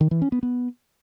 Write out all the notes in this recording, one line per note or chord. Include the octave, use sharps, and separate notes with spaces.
D#3
E3
C#4
B3
B3